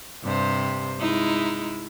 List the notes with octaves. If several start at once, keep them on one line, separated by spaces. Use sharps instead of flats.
G2 C3 C5
G#3 D#4 E4